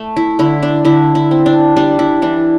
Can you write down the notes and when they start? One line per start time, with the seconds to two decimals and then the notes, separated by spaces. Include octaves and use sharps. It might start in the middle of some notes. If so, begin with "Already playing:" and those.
Already playing: A3
0.17 E4
0.39 D3 E4
0.63 D4
0.85 D3 E4
1.15 E4
1.31 C4
1.46 D4
1.76 G3 D4
1.99 E4
2.22 E3 D4